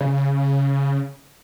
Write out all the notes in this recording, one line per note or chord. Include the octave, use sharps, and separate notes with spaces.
C#3